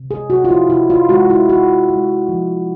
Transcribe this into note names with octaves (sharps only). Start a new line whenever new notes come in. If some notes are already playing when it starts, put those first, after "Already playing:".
Already playing: C3
G#4
C3 F#4
F4
E4
C3 E4
F4
G#3 F#4
E4
G#3 F#4
G#3
F3